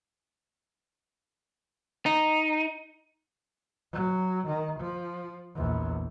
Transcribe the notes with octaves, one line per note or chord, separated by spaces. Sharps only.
D#4
F#3
D#3
F3
A#1 E2